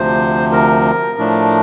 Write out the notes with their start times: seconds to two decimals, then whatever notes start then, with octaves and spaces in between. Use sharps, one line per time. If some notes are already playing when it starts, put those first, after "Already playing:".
Already playing: D2 C3 F3 C5
0.52 A#4
1.18 A2 F3 A3 D4